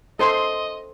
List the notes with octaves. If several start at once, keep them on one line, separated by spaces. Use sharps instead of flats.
A4 C5 D#5 C6